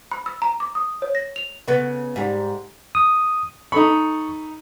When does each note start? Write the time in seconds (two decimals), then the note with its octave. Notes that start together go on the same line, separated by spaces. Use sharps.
0.11 B5
0.26 E6
0.42 A#5
0.60 D6
0.75 D#6
1.02 C#5
1.15 A#6
1.36 F7
1.68 C#3 B3
2.16 G#2 G3
2.95 D#6
3.72 D#4 A4 B5 C#6